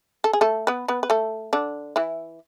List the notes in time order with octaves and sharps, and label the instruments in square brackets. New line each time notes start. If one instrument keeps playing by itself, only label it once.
[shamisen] A4
G#4
A3 A4
B3 B4
B3 B4
B4
A3 A4
D3 D4
E3 E4